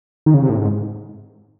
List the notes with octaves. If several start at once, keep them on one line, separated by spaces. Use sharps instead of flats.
D#3
C#3
C3
A2
G#2